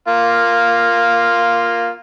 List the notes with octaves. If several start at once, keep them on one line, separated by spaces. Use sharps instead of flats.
A#3 F4